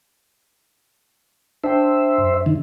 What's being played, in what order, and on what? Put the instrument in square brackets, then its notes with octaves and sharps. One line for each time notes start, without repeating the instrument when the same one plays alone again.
[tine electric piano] D4 G5 [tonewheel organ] C5 E5
[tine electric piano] F#2
[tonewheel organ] D3 D#3